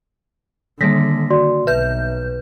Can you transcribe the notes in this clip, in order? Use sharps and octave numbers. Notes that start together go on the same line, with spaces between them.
D3 D#3 G3 A#3 A#6 B6
F#4 D5 C6
B1 B4 E5 G6